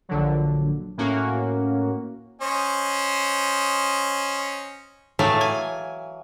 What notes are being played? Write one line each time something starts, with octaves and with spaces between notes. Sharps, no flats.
A#1 D3 F#3
A2 A#3 C#4 F#4
C#4 C5 D#5
A2 E3 F#3 A3 F5
G#5